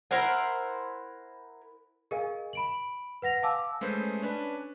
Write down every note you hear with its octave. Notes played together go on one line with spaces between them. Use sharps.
E4 A#4 C5 F#5
G#4 A#4 D#5 F5 G#5
B5 D7 F#7
B4 F#5 A#6 F7
F5 G#5 A5 D6 E6
G#3 A3 C#4 B4 C5
C#4 D4 B4